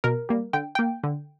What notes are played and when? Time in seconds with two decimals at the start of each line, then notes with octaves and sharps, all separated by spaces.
0.04 B2 A#4
0.29 G3 A#3
0.53 D3 G5
0.75 A#3 G5
1.04 D3